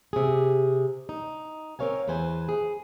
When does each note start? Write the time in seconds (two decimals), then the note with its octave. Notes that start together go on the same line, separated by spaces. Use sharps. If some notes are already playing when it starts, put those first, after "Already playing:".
0.13 C3 G#4
1.09 D#4
1.79 C4 A#4 C#5 F5 G#5
2.08 E2 E3 B4 C5 G#5
2.49 G#4